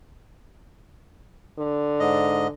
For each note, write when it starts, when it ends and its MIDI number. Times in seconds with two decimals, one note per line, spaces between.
1.58 2.51 50
2.00 2.47 44
2.00 2.47 75